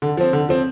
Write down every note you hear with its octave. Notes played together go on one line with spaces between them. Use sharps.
D3
F3 C4
D3
F3 C4